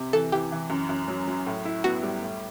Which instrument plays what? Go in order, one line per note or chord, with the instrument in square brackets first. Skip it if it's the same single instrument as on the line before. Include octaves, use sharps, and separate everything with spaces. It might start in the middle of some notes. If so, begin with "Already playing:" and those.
Already playing: [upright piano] C3
[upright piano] E3 [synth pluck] A4
[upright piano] E3 [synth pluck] G4
[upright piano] E3
F#2
F#2
F#3
F#3
A2
E4
[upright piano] B3 [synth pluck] F#4
[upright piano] G3
A2